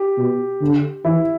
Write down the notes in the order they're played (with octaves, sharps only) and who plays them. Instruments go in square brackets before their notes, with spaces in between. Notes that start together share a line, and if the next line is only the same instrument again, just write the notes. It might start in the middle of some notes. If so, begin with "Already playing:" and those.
Already playing: [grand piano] G4
[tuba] B2
D3
[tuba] E3 [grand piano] E4